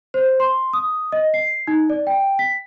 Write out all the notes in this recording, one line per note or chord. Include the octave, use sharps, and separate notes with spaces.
C5
C6
D#6
D#5
C7
D#4
D5
G5
B6